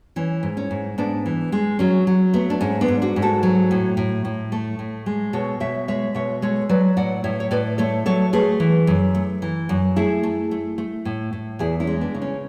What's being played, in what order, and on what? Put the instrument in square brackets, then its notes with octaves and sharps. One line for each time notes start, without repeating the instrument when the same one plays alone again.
[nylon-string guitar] E3 C#4
G#2
C#4
G#2
G#2 B3 D4
E3
G#3
F#3 C#4
F#3
A3 B3
D4
G#2 C#4
B3 D4
G#2
D4 F#4
G#2
F#4 A4
F#3
A2
A2
A2
A3
A2
G#3
B2 A4 C#5
B2 C#5 E5
G#3 C#5 E5
B2 C#5 E5
G#3 A4 C#5
F#3 B4 D5
A2 D5 F#5
A2 C#5 E5
C#5
A2 B4 D5
A3 A4 C#5
F#3 A4 C#5
A3 G#4 B4
E3
F#2
A3
E3
F#2
A3 E4 G#4
A3
A3
A3
A2
A2
E2 E4 G#4
C#4 E4
G#3
B3 D4
C#3
C#4